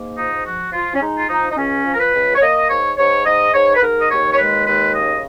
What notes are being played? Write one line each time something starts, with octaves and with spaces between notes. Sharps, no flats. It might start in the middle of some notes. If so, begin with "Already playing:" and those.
Already playing: G#2 A#3
F3 D#4
F3 F#4
F3 F4
C#4
G#3 D#4
F4
F3 D#4
D#4
C#2 C#4
F3
A#4
B4
C#2
C#5
A#3 D#5
G#2 C#5
G#2 C#5
G#2 D#5
G#2 C#5
B4
G#2 A#4
D#5
D#2 C#5
C#5
G#3 B4
D#2 B4
C#3 D#5